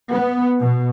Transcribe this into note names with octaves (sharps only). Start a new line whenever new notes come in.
B3
B2